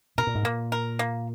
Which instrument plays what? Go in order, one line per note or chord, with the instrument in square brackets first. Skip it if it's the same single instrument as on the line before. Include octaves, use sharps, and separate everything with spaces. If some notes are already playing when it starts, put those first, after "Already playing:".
[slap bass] B2 [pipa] A#4
[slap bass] A#2
G#2
[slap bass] A#2 [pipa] A#3
[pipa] A#4
A#3